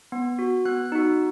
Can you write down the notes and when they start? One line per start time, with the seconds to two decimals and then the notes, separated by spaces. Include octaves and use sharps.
0.12 B3
0.39 F#4
0.65 B3 F#6
0.92 D#4 F#4